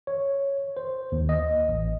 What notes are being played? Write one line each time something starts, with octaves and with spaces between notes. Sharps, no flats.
C#5
C5
D#2
D#5
A1